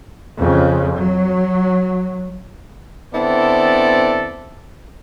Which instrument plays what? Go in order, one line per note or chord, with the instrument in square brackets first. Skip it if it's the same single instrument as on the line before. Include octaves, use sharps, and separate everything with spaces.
[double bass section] F2 C#3
F#3
[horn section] D3 B3 C4 E4 A4 D5